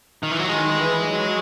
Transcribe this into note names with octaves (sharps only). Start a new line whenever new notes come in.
D#3
E3
F#3
D#3 G#3
E3
F#3